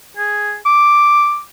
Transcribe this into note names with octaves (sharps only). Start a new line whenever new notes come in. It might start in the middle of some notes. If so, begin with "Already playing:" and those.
G#4
D6